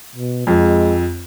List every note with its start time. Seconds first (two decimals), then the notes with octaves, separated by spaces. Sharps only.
0.16 B2
0.47 F2 G#3